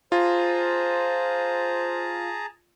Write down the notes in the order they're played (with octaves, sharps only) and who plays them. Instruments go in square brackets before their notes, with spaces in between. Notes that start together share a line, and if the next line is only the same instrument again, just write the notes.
[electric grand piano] F4 [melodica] G#4 A5 A#5 [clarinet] C5